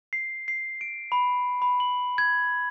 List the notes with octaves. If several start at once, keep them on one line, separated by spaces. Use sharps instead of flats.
C7
C7
D7
B5
B5
F#7
G#6